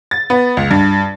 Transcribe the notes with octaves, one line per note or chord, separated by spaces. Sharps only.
A6
B3
C#2
G2